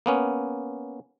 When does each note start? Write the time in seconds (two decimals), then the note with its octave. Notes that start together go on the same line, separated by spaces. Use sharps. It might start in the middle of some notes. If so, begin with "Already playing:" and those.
0.06 A#3 B3 C#4